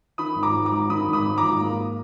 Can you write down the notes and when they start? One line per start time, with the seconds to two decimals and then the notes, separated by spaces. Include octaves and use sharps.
0.18 D#3 B5 D#6
0.36 G#1
0.43 A#5 D6
0.55 G#2
0.66 A#5 D6
0.72 G#1
0.89 D#3 B5 D#6
1.08 G#1
1.13 B5 D#6
1.25 G#2
1.38 A#5 D6
1.43 G#1
1.61 A#3